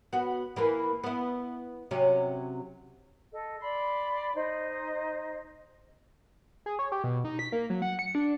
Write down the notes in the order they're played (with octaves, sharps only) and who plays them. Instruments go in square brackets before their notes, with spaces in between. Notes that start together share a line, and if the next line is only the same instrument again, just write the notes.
[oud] B3 F#4
E3 A#3 B4
B3 E4
C3 F#3 C#4
[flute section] A4 D#5
D5 B5 C6
D#4 C5 D#5
[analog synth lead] G#4
C#5
G4
B2
D#4
B6
A#3
F#3
F#5
C#7
D4